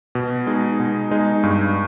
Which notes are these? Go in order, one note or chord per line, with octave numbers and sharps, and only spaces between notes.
B2
G#3 D#4
B2
G#3 D#4
G2